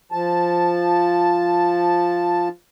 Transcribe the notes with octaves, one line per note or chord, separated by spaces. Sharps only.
F3 A5